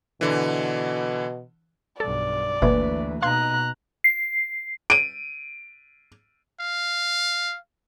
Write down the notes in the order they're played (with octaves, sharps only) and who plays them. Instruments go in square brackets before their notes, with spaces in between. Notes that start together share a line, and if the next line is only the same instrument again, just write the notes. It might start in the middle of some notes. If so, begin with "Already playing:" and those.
[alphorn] B2 [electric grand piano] D3 E3
[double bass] B1 G2 [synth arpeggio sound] A4 [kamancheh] D5
[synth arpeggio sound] G1 B2 F3 [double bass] D2 E3 [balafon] A#3 B4 E5
[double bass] B2 D#4 [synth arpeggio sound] F5 C6 G#6 [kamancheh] A#5 F#6
[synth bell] C7
[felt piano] D7 D#7
[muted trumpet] F5